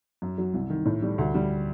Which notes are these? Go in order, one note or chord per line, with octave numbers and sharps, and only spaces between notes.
F#2
F#3
C2
D#3
A2
G3
D2
G3